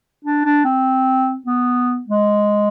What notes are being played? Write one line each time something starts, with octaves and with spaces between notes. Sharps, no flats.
D4
D4
C4
B3
G#3